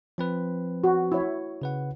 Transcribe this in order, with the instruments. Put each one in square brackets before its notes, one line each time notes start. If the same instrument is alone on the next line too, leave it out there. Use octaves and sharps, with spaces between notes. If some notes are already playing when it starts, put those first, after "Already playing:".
[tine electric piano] F3 C4 B4
[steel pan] F#4
E4 C#5
[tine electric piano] C#3 B4 F#5